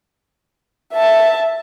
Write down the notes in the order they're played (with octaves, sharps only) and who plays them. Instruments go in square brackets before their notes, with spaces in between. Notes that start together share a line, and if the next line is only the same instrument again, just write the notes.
[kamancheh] E5 A5